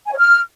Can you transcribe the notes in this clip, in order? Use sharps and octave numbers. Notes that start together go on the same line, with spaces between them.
G#5
C#5
F6